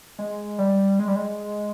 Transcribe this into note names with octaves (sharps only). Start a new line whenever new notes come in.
G#3
G3
G#3
G3
G#3